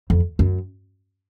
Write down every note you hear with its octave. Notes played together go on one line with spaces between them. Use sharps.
F2
F#2